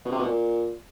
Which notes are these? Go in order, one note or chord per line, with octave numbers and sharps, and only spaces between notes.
B2
C3
B2
A#2